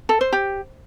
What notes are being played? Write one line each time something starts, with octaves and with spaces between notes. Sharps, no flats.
A4
C5
G4